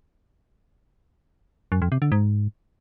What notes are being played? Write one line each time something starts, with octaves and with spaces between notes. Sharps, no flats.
F#2
F2
C3
D3
G#2